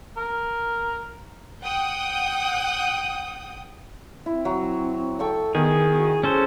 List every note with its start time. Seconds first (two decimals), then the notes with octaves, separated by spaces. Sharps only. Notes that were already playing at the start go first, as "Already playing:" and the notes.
0.17 A#4
1.63 F#5 G5 D#6
4.26 C4 E4
4.45 F#3
5.19 A4 G5 C#6 E6
5.55 D#3 B3 G#4
5.96 F#4
6.23 C#4 G#4 A4 C5